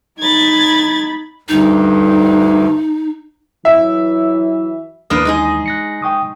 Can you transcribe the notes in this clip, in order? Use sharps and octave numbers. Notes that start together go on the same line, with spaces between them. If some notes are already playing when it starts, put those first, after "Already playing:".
D#4 B5 G#6 A6
D2 G2 D#4
E3 F#3 E5
D#2 E3 A#3 D4 B4 D#6
G#3 D#4 G#4
F#6 A#6 C#7
G5 C#6 D#6